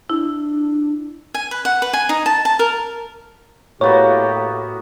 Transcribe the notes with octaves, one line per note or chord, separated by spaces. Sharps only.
D4 E4
G#5
B4
F#5
B4
G#5
D#4
A5
A5
A#4
A2 A#3 B3 F#4 G4 C#5